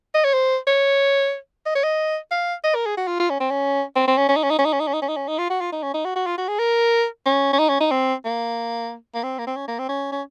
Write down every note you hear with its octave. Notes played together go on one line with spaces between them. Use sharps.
D#5
C#5
C5
C#5
D#5
C#5
D#5
F5
D#5
A#4
G#4
F#4
F4
F4
C#4
C4
C#4
C4
C4
C#4
C#4
D#4
C#4
D#4
C#4
D#4
C#4
D#4
C#4
D#4
C#4
D#4
C#4
D#4
F4
F#4
F4
D#4
C#4
D#4
F#4
F#4
F4
F#4
G#4
A#4
C#4
C#4
D#4
C#4
D#4
C4
A#3
A#3
C4
A#3
C4
C#4
A#3
C4
C#4
C#4